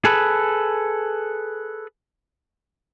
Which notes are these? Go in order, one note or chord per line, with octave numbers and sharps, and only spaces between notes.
G#4 A4 B4